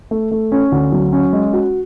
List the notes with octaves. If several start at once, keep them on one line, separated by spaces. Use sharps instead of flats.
A3
A3
C#4
D2
F#3
C#4
G#3
F#4